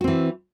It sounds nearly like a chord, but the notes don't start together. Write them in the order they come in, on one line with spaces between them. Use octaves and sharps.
F#4 C4 E3